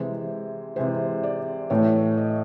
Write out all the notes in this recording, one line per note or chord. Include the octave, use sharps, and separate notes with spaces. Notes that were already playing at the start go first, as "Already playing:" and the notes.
Already playing: C3 E3 G#3 C5
C3 E3 G#3 C5
D5
A2 E3 A3 C#5
D#5